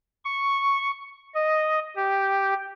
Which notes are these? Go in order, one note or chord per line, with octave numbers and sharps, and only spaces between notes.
C#6
D#5
G4